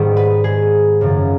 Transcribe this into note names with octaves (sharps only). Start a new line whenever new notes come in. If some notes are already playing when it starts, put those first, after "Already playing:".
Already playing: G#2 D#3 G3 B3
B4
G#4
F#2 C#3 F3